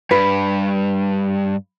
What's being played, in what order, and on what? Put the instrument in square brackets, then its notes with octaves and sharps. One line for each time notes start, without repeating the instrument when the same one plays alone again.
[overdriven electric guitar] G2 [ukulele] B4